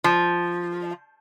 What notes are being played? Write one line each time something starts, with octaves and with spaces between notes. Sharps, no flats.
F3